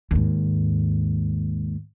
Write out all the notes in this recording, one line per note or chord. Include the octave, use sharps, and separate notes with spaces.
D#2 G#2